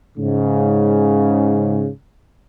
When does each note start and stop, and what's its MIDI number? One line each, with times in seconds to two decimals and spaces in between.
0.18 1.89 44
0.18 1.89 49